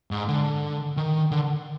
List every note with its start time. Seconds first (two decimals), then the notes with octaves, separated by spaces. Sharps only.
0.11 G#2
0.28 D3
0.97 D#3
1.32 D3